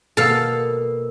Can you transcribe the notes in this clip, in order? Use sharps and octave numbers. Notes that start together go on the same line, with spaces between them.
B2 A#3 A4 F5 E6